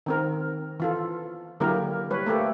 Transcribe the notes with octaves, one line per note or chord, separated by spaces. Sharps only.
D#3 C4 A#4
E3 F4 A4
D3 F#3 A#3 E4 G4 A#4
G3 B4 C#5
A3 A#3 G4 A4